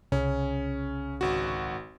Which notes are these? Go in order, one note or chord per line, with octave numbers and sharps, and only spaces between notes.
C2 C#3 C#4
G#1 F#4